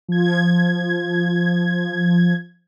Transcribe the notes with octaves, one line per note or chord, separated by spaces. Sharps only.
F3 G#6